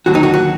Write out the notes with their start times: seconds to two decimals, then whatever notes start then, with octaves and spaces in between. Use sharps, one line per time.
0.06 D#2 D3 F#3 F#4
0.15 D#4
0.23 F#4
0.34 F#4